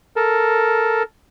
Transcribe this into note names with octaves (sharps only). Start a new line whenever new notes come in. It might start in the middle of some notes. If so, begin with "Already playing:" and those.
A4 A#4